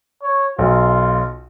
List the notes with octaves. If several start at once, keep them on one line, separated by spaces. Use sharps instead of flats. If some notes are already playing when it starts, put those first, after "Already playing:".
C#5
B1 F4